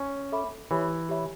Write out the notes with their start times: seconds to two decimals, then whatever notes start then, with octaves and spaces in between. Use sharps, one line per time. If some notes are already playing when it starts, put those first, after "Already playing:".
Already playing: C#4
0.32 A4 E5 B5 D6
0.71 E3 G4 C#5 E5 B5
1.09 G4 C#5 E5 B5